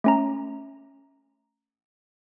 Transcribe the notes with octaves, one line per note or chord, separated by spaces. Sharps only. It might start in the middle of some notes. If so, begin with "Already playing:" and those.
A3 C#4 A#5